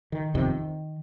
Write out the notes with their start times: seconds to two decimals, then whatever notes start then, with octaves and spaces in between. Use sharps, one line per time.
0.12 D#3
0.34 G1 F2 C3 D#3